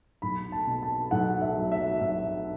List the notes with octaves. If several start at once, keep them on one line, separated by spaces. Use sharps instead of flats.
B1 B5
A5
B2
A5
B1 F#5
E5
F#3
E5
B1 E5